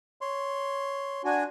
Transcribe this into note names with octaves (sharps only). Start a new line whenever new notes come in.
C#5 C6
D4 F#4 G#5